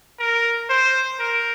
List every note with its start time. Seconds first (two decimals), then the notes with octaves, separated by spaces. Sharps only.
0.19 A#4
0.69 C5
1.19 A#4